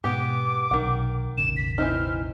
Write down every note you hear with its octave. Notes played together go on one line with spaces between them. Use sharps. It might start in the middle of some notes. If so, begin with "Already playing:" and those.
G#2 B2 B3 G4 D6
B1 C3 D#3 F#5
E1 A1 C#3 E7
B6
E3 C4 D#4 F6